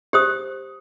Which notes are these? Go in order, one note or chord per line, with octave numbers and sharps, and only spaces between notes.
G4 C5 D#6